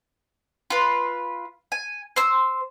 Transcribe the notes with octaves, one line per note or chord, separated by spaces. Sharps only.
F4 B4
G#5
C5 E6